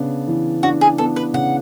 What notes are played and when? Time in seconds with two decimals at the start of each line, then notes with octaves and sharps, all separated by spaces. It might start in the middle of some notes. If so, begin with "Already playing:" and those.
Already playing: C#3 B3 D4
0.28 E3
0.63 D4 F#4
0.81 G#4
0.98 B3 A4
1.16 B4
1.34 C#3 F#5